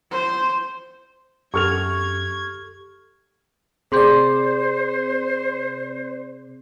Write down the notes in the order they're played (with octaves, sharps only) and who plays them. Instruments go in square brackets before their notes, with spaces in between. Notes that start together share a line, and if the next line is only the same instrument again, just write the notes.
[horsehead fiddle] C5
[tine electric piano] F#2 [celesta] G4 A4 [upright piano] C#6 F6 F7 [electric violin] G#6
[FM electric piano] C3 C4 D5 [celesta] G#4 C6 G6 [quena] C5